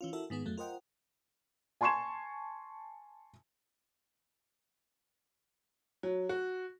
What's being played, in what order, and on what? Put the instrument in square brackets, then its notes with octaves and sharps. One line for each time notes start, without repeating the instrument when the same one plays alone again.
[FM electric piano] E3 C#4 F4
E4 F#4 A4 A#4 E5
G#2 D#3 B3 G#4
F2 F#3 A3
F4 A#4 C5 D#5 F#5 G5
[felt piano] G#5 A5 C6 C#6 G#6 E7
[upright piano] F#3
F#4